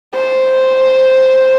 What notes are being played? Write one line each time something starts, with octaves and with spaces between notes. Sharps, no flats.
C5